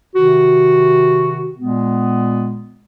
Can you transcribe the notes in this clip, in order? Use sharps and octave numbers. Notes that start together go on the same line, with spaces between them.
C3 D#3 F#4
A#2 G#3 B3